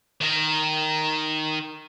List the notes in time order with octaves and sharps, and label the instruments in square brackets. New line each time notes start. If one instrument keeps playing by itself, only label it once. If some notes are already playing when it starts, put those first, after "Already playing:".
[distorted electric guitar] D#3 A#4